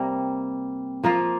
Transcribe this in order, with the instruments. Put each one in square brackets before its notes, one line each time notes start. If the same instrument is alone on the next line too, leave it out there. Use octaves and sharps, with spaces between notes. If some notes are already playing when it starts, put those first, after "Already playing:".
Already playing: [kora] C3 G3 A#3
F3 A#3 F4